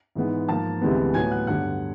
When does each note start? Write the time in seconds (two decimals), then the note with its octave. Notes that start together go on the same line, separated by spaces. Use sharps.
0.15 G#2 E3 G#3 B3
0.48 G#2 F3 A#3 A5 A6
0.81 D2 C3 E3 G#3 B3
1.14 A2 F#3 B3 G#5 G#6
1.31 F#5 F#6
1.47 G2 D3 F#3 B3 F#5 F#6